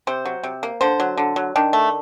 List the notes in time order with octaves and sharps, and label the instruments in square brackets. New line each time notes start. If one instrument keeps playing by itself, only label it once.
[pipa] C3 C5
F#3
C3
A#3
D3 C5
F#3
D3
F#3
D#3 D4
A3